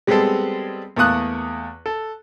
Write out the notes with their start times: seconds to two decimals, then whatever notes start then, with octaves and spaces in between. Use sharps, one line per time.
0.07 G3 G#3 B3 C4 G#4 A4
0.97 E2 A3 A#3 D#6 F#6
1.86 A4